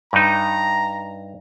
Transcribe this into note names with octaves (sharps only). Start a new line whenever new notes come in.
G2 D#4 A#5